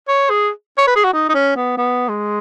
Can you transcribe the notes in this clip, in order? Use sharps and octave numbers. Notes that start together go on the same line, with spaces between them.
C#5
G#4
C#5
B4
G#4
F#4
D#4
D#4
C#4
B3
B3
G#3